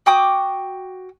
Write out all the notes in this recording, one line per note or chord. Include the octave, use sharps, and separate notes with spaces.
F#4 G5 D6 D#6